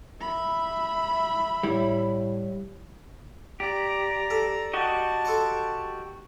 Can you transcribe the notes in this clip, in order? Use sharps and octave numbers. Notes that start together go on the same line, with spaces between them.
E5 B5
A2 G3 E4
G4 D5 A#5
A4
F#4 G4 D#5 A5
A4 C5 C#6